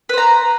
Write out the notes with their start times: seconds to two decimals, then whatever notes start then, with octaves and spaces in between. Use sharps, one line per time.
0.09 B4
0.13 C5
0.18 A#5